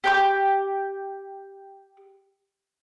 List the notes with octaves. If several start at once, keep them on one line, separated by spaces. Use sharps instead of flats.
G4 G5 D6